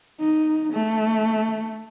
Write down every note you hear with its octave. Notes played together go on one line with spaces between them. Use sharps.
D#4
A3